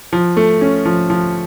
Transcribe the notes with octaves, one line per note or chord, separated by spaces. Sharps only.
F3
A3
C#4
F3
F3